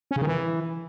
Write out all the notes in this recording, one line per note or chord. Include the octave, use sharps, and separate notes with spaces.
C#4
C#3
D#3
E3